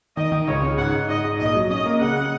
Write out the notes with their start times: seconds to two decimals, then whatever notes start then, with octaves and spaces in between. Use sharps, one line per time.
0.17 D#3 D#5
0.32 D#3
0.47 C#2 C#5
0.62 C#3
0.78 G#2 F#5
0.93 D#4
1.09 G#2 D#5
1.24 G#2
1.39 A#1 D#5
1.55 F#3
1.70 C#4 D#5
1.86 A#3
2.00 C#3 F#5